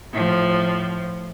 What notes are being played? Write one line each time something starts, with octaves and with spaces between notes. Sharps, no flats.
A2 F3